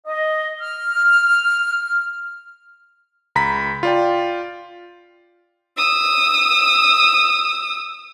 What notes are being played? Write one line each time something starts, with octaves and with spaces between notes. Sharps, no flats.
D#5
F6
C#2 A#5 B5 B6
F4 D5 G5
D#6 E6